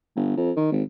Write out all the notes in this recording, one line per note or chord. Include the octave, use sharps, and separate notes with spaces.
G1
F2
D#3
G#1